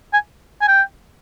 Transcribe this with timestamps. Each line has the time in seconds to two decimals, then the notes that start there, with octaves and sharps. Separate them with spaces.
0.13 G#5
0.61 G#5
0.68 G5